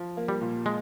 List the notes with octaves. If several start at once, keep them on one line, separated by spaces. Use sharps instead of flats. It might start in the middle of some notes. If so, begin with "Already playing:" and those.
Already playing: F3
A#3
G3
A#2
G#3